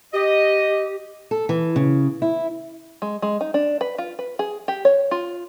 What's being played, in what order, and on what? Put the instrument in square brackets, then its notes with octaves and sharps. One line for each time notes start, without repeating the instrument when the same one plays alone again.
[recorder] G4 [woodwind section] D#5
[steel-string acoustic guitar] A4
E3
C#3
E4
[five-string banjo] G#3
G#3
D#4
D4
B4
F4
B4
G#4
G4
C#5
F4